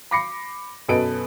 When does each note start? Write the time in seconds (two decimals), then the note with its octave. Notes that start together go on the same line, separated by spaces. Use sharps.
0.11 B5 D6 A#6 C7 C#7
0.88 F#2 B2 A4 B4 D#5 D7